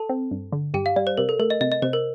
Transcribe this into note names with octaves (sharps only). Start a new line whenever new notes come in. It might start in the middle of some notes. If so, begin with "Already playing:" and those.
Already playing: A4 A5
C4
G2
D3
G2 G4 G5
F5
G3 D5
C5
C3 A#4
A4
A3 A#4
D#5
C3 D#5
D#5
C3 C5
A#4